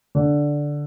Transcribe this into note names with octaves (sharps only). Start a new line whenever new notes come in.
D3